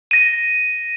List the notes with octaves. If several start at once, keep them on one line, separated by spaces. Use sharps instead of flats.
A#6 D#7